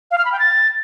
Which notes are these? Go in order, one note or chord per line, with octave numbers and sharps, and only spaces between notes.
F5
F6
B5
G5
A6